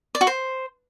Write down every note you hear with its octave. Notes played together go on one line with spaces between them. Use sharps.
D5
F#4
C5